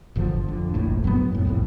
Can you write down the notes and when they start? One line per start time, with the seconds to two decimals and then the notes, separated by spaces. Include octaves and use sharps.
0.16 G1 G2 D3 F3
0.48 F2 D3
0.74 F1 A#1 A2
1.04 F#2 F#3 G#3 B3
1.32 F#2 A2
1.45 C2 F2 A2